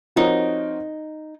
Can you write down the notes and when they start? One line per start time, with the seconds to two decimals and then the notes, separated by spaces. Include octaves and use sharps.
0.16 F3 C4 D#4 F#4 A#4 C#5